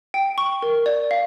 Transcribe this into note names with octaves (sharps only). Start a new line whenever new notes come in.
G5
C#6
A#4
D5
F5